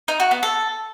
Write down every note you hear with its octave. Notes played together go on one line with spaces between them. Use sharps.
D#4
F#4
B3
A4